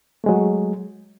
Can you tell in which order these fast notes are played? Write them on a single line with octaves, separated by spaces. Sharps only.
A3 G#3 F#3